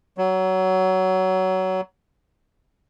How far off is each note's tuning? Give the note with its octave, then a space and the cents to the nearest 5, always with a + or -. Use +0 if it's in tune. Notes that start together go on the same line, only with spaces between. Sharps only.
F#3 +20